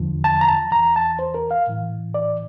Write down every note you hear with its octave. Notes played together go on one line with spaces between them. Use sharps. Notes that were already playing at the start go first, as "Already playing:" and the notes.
Already playing: E2 D3 F3
A5
A#5
A5
E2 E3 A#5
A5
C5
A#4
F5
A2 E3
D5